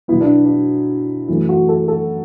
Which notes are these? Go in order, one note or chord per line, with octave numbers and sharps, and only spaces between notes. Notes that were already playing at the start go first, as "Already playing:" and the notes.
B2 F#3 B3 E4
D4
D4
F#2 E3 A3 E4
F#4
A4
A4